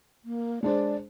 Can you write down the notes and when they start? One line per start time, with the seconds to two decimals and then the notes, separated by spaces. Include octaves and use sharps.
0.25 A#3
0.63 G#3 D4 C5 D5